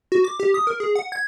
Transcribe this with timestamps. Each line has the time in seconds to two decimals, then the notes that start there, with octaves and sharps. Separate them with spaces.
0.12 F#4
0.24 D6
0.40 G4
0.54 D#6
0.67 A#4
0.80 G#4
0.95 F#5
1.12 G#6